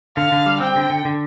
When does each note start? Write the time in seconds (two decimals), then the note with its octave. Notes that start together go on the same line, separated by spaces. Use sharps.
0.17 D3 F5
0.32 D3
0.46 G3
0.60 C4 G5
0.76 D3
0.90 D3
1.05 D3